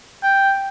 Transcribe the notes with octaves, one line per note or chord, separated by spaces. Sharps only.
G5